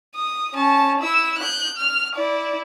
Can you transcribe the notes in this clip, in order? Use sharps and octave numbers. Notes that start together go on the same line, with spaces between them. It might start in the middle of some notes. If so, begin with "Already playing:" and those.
D#6
C#4 A5
E4 E6
F#6 G6
F6
E4 D5